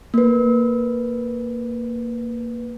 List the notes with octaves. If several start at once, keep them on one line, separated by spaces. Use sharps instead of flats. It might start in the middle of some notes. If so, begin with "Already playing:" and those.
A#3 B4